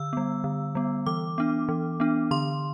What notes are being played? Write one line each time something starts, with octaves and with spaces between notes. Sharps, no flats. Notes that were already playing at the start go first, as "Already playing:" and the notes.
Already playing: D3 E6
G3 B3
D3
G3 B3
E3 D6
B3 D4
E3
B3 D4
D3 C6